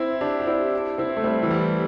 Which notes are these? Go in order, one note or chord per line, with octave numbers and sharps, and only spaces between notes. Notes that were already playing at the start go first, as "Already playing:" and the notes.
Already playing: C4 E4
D4 G4
G4
C4 E4
C4 E4
A3
G3 C4
E3
G3